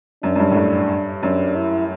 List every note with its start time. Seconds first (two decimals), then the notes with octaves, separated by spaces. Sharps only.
0.23 F#2 D4
0.35 F#2
0.40 G2
0.51 A2
0.57 G2
1.23 F#2 D4
1.56 E4